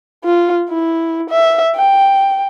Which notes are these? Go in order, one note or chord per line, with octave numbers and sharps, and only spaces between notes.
F4
E4
E5
G5